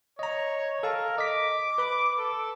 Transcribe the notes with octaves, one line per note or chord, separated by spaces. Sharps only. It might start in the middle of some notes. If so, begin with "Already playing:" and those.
C#5 D#5 A#5
A4 A#4 F5 A5
D#5 D6 B6
B4 B5
A4